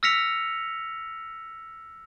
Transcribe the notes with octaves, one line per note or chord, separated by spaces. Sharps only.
E6 F6 A#6 B6 C#7 F7